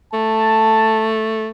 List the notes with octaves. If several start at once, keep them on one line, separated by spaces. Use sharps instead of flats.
A3 A5